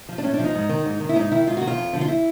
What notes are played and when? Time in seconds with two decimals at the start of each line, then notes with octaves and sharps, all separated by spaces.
0.09 F3
0.18 D4
0.23 A2 C#4
0.34 D4
0.39 F3 D#4
0.55 G#2
0.69 D#3
0.85 G#2
1.00 D#3
1.09 E4
1.15 G#2 D#4
1.31 D#3 E4
1.47 G#2 F4
1.57 F#4
1.62 D#3
1.67 F4
1.78 F2
1.93 D3 F3
2.01 F4
2.08 E4